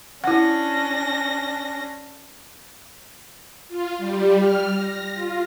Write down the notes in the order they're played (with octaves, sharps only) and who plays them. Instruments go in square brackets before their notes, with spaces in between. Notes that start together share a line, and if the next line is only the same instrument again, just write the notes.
[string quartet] C#4 D4 A#6 [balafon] E4 F#5
[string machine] F4
G3
F6
A#6
F4